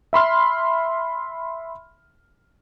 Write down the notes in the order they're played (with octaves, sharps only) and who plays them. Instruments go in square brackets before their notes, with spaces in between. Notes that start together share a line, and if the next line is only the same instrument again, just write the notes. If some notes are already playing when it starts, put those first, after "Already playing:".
[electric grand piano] E5 B5 C6 F6